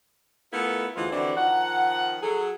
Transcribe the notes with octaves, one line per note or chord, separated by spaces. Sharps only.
A3 B3 E4 F4 A4 A#4
D2 E3 F3 G#3 B3 F4
D3 E3 C4 D4 E4 F#4
D#3 F3 D#4 F#5
F#3 G#4 A4